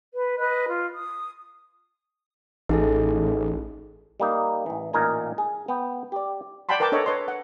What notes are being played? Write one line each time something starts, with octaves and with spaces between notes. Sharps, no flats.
B4
B4 D#5 F#6
F4
D#6
A1 D#4 G#4 A4
G3 A#3 D#4
A1 E3
A1 A#2 D#4 A#4 G#5
G#4
B3 G5
G4 D5
D5 F#5 G5 A5 B5 C6
A#4 B4 G5 A5 D6
D4 A4 C#5 D#5
B4 C#5 D#5 C6
F#5